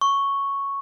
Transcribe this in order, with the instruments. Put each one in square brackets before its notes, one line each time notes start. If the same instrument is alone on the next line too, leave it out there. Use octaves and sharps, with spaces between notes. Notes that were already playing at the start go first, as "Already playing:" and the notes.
[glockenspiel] C#6